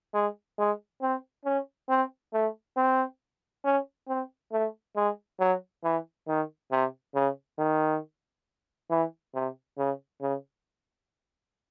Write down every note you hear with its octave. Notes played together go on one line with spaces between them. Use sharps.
G#3
G#3
C4
C#4
C4
A3
C4
C#4
C4
A3
G#3
F#3
E3
D#3
C3
C#3
D#3
E3
C3
C#3
C#3